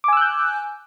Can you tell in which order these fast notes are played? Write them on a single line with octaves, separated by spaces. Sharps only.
D6 G#5 E6 F#6 G6